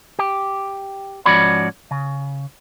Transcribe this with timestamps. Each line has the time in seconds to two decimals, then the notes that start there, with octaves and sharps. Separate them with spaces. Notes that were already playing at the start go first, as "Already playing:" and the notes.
0.19 G4
1.26 G#2 F3 C#4 F#4 D5 B5
1.91 C#3